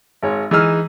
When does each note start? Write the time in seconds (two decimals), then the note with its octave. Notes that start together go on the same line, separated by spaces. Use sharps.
0.23 G#1 G#3 C#5
0.51 E3 G#3 D#4 G#4 E6 F6